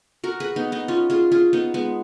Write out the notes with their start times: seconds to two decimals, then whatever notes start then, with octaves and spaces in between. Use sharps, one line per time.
0.24 F#4 A#4
0.40 G#4 B4
0.56 B3 D#4
0.72 B3 D#4
0.88 C#4 F4
1.10 F4 G#4
1.32 F4 G#4
1.53 B3 D#4
1.74 G#3 B3